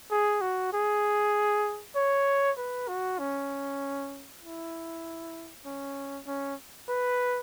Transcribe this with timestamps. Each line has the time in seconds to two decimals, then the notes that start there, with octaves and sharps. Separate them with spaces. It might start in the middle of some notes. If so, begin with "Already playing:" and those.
0.11 G#4
0.41 F#4
0.73 G#4
1.96 C#5
2.58 B4
2.89 F#4
3.19 C#4
4.43 E4
5.65 C#4
6.27 C#4
6.89 B4